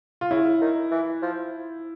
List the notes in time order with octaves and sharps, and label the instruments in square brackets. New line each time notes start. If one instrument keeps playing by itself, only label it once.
[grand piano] F4
[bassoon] C#3 [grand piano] E4
[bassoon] D#3
E3
F3